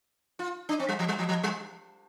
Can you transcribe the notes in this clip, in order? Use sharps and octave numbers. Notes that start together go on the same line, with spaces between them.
F4
D4
C4
G3
F3
G3
F3
F3
G3